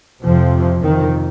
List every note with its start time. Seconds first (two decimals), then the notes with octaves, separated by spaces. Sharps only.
0.23 F2 C3 F3
0.82 F2 C3 D#3